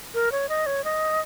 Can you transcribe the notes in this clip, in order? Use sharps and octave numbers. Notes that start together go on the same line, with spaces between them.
A#4
C#5
D#5
C#5
D#5